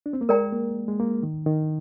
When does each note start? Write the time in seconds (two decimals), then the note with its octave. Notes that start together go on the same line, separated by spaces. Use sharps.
0.06 D4
0.13 C4
0.21 A#3
0.29 G#3 A#4 D5 G5 A#5
0.52 A#3
0.88 G#3
1.00 A#3
1.23 D#3
1.46 D#3